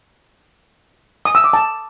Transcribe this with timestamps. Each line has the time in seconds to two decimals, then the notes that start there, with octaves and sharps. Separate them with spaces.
1.25 D#6
1.35 E6
1.44 D6
1.53 A5